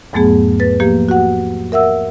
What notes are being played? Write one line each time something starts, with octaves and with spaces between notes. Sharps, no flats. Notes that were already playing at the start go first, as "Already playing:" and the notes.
E2 G#2 F#3 A3 B3 G#4
B4 A6
F3 A#3 G4
F#4 F#5
A#4 E5 F#5 E6